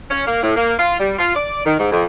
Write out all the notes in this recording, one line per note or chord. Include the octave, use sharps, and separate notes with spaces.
C#4
A#3
A2
A#3
F4
G3
F4
D5
D#3
G#2
F2